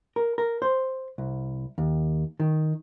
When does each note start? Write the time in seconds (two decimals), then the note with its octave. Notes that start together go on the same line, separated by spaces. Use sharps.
0.16 A#4
0.38 A#4
0.62 C5
1.18 C2
1.78 D#2
2.40 D#3